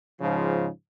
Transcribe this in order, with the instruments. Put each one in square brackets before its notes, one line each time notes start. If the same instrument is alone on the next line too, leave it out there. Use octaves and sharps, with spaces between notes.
[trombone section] G#2 C#3 F3